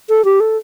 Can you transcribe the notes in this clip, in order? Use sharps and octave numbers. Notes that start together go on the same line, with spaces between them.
A4
G4
A4